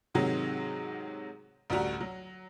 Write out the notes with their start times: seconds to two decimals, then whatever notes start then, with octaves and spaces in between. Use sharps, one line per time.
0.14 G#2 C3 D#3 F#3
1.70 A1 D2 G3 F#4 A#5
2.00 F#3